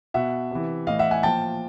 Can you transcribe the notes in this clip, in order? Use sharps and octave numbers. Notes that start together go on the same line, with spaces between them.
B2 E5 F#5
C3 E3
A2 E3 D#5 F5
E5 F#5
F#5 G#5
A#2 F3 G5 A5